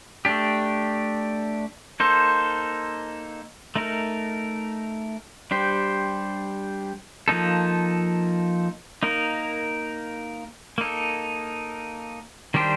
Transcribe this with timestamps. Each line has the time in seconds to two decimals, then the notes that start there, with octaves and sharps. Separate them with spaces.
0.25 A3 D4 G4
2.00 A#3 D#4 A4 C5
3.76 A3 D#4 A#4
5.51 G3 D4 G4 C5
7.28 F3 A#3 D#4 A4
9.03 A#3 D#4 A#4
10.78 A#3 D#4 A4
12.54 D#3 G3 D4 G4 C5